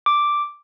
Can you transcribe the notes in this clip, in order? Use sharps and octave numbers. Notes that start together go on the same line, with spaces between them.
D6